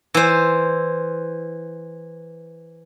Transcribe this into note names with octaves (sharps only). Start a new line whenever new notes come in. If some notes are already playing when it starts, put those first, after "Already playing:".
E3 C5